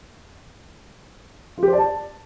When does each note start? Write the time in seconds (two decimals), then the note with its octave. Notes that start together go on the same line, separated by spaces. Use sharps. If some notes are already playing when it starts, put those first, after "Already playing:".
1.58 F4
1.63 G4
1.68 C5
1.73 D5
1.78 A5